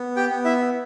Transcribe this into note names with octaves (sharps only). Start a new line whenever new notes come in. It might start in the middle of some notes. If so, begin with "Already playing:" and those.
Already playing: B3
G4 G5
B3
E4 E5